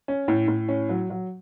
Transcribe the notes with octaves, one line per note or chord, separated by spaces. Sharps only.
C#4
A2
A2
C#4
F#3
F#3